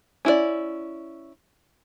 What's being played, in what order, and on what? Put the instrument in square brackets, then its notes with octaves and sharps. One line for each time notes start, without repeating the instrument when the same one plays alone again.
[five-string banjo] C#4 E4 F4 D5